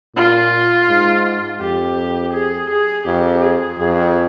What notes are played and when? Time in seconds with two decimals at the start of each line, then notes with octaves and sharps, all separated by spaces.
0.15 A#2 F4
0.89 G#2
1.61 F2 G4
2.34 G#4
2.70 G#4
3.06 F2 G4
3.43 G#4
3.79 F2 G#4